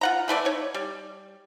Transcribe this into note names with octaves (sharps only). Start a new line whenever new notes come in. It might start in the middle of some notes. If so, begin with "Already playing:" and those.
F4 F#5 A#5
E3 A3 B4 D5
D#4 C#5
G3